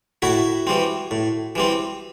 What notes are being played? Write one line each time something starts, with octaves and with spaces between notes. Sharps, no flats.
A2 E4 F#4
E3 G3 C4
A2
E3 G3 C4